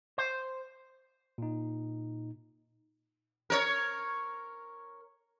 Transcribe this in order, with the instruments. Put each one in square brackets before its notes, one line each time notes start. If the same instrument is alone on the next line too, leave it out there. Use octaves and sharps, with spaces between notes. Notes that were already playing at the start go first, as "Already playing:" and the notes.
[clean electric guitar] C5
[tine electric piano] A#2 D#4
[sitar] A#4 C#5